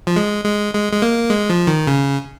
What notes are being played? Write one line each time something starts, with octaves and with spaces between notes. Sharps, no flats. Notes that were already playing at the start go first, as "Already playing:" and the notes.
F3
G#3
G#3
G#3
G#3
A#3
G#3
F3
D#3
C#3